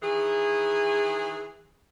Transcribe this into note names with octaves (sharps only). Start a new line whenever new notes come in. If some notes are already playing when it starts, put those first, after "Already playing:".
D#3 E3 G#4